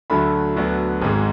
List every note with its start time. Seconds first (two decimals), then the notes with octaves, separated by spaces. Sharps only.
0.10 D2 D3 F#3 A3 B5
0.56 D2 D3 F#3 B3
1.01 G#1 G#2 G#3